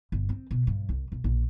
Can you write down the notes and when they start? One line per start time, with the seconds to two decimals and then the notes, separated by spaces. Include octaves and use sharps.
0.12 G1
0.29 C4
0.51 B2
0.67 G2
0.89 C2
1.12 B1
1.24 A#1